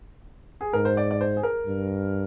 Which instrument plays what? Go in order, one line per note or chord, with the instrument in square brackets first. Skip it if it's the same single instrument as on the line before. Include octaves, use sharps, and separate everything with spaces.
[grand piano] G#4
[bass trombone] G#2 [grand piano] A#4
[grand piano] C5
D5
D5
C5
G#4
A#4
[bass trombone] G2